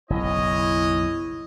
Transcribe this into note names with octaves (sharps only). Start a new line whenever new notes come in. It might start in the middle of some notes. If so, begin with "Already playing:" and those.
F#1 B1 G#3 E4 C#5 D#5